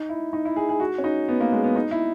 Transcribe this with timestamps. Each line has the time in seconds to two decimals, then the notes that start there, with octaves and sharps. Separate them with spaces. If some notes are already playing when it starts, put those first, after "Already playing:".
Already playing: D#4
0.09 E4
0.33 D#4
0.45 E4
0.56 G#4
0.69 G#4
0.80 F#4
0.98 C#4
1.04 D#4
1.28 B3
1.40 A#3
1.52 G#3
1.64 B3
1.76 D#4
1.91 E4